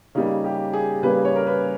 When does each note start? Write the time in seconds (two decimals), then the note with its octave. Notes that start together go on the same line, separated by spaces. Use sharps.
0.15 C#3 G3 A#3 D#4
0.44 G4
0.73 G#4
1.02 C#3 G3 A#3 B4
1.25 C#5
1.36 A#4
1.47 B4